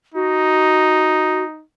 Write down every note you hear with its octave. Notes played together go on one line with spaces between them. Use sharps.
D#4 F#4